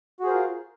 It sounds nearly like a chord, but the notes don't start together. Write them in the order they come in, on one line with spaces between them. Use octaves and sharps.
F#4 G#4 C5 A#4 F4